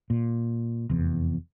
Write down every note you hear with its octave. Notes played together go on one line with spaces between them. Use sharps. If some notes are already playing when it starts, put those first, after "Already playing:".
A#2
F1 E2